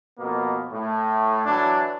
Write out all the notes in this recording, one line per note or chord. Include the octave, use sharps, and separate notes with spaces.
F2 B2 A#3 B3
A2
E3 F#3 D4